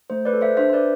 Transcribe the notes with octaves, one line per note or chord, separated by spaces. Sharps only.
A3 C5
B4 D5
A4
C5 E5
D4 C5 E5
C5
B4 D5